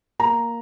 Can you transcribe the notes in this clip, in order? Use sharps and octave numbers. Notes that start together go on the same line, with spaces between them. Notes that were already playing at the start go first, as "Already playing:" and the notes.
A#3 A#5